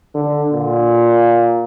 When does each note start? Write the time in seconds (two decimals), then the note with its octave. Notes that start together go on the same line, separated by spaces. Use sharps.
0.15 D3
0.52 A#2